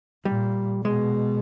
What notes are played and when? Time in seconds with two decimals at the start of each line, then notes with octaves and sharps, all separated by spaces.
0.25 A#2 G3
0.85 B2 G#3